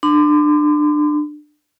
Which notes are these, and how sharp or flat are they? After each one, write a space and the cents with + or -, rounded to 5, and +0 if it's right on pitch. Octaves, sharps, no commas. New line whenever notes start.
D4 +25 C6 -40